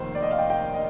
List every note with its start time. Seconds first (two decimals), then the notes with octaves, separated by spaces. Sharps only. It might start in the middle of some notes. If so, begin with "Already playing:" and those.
Already playing: F1 D#2 D#3 C5
0.15 D5
0.22 D#5
0.31 F5
0.39 G5
0.50 G5
0.74 D#5